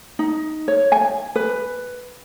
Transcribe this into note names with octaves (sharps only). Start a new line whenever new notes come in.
D#4
C#5
G#5
B4